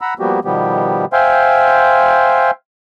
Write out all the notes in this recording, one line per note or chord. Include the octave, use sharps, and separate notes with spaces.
F#5 A#5 B5 E6
F3 G3 A#3 B3 F#4 G4
B2 D#3 F3 G3 B3 G4
C5 E5 F5 G5 G#5 C6